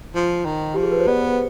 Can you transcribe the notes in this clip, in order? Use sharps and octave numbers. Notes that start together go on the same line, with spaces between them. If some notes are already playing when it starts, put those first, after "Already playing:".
F3
D#3
F3 G4
G#4
B4
C5
B3 D5